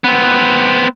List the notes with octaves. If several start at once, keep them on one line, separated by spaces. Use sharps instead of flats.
B3 C4